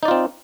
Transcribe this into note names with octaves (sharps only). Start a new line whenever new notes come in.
C4 D#4 F4 D5